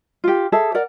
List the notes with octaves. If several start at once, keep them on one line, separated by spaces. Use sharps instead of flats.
F4 G4
G#4 A4 E5
A#4 D5 F#5